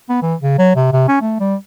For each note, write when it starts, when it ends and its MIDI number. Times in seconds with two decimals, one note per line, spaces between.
0.10 0.20 59
0.22 0.35 52
0.41 0.57 49
0.59 0.71 54
0.76 0.92 48
0.92 1.06 48
1.08 1.20 61
1.21 1.40 57
1.40 1.55 55